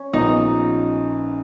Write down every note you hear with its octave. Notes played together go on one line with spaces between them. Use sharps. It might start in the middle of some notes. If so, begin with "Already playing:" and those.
Already playing: C#4
A#1 A#2 F3 B3 D#4